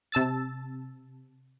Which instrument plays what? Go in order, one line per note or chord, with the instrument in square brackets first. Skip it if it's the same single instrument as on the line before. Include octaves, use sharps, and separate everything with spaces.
[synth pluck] C3 A5 E6 A6